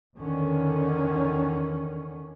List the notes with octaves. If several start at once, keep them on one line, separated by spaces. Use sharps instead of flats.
E2 D3 D#3 C#4